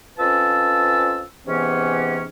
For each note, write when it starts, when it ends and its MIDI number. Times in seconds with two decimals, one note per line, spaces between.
0.18 1.23 41
0.18 1.23 53
0.18 1.23 61
0.18 1.23 71
0.18 1.23 81
0.18 1.23 88
1.46 2.26 44
1.46 2.26 48
1.46 2.26 52
1.46 2.26 59
1.46 2.26 61